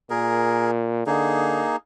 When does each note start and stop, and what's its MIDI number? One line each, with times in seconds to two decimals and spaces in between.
0.10 1.04 46
0.10 0.71 68
0.10 0.71 70
1.07 1.66 50
1.07 1.76 58
1.07 1.76 63
1.07 1.76 68